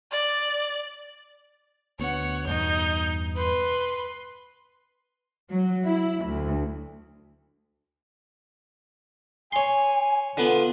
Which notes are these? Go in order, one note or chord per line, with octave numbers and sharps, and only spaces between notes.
D5
D2 B3 C#5 F#5
E2 G2 B2 D#4 G6
B4 C6
F#3
E4
D2
C#5 G#5 C6
D3 B3 F4